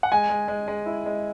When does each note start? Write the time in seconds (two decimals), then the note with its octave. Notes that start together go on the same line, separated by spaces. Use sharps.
0.03 F#5
0.12 G#3 G#5
0.29 G#3
0.48 G#3
0.68 G#3
0.86 E4
1.06 G#3